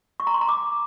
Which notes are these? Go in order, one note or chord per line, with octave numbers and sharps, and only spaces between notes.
C#6
A#5
C6
A#5
D6